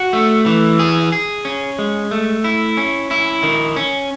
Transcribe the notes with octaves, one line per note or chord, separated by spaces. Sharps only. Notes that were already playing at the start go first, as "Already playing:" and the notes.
Already playing: F#4
A3
E3
G#4
G#4
C#4
G#3
A3
E4
C#4
E4
D#3
C#4